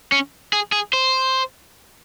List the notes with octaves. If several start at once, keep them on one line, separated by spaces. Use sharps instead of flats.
C#4
G#4
G#4
C5